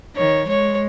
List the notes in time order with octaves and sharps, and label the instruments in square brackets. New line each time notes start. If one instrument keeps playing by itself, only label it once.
[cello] D#3 [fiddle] C#5
[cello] G#3 [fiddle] C#5